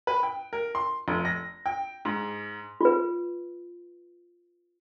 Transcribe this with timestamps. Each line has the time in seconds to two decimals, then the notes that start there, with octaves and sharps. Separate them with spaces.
0.07 B4
0.23 G5
0.53 A#4
0.75 C6
1.08 F1
1.25 A#6
1.66 G5
2.05 G#2
2.81 F4 B4